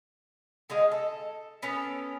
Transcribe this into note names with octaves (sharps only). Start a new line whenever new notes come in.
D3 G#3 D#5 F5
A4
B3 C#4 A4 A#4